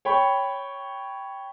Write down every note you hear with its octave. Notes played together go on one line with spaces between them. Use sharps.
C#5 G5 B5 C#6